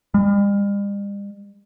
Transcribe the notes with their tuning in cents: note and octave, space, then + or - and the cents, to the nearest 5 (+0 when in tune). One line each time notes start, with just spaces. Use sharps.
G3 +45